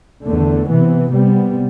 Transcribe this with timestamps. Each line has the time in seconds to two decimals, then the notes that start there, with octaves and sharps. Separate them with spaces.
0.23 E2 D3 A3
0.67 C3 E3 B3
1.11 C3 G3 B3